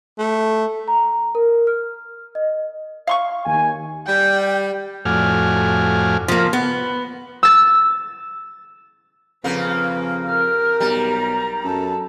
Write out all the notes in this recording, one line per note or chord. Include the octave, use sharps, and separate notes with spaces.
A3
A#5
A#4
F6
D#5
F5 C6 C#6
D#2 G#5
G3 G5
F2 A2 F#4 D5 G#5 F6
F3 A#3
B3
E6 A6
F2 C#3 A#3 B4
G4 A#4 F6
B1 G3 A#5
F#2 A4